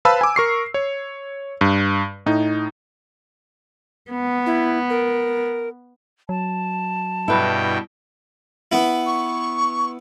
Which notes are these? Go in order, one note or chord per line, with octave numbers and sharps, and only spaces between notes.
B4 C5 F5 A5 B5 E6
G#5 D6
A#4 C#6 C7
C#5
G2
A2 D#4
B3
E4
A#4
F#3 A5
G2 B2 E4 B4 G5
B3 E4
C#6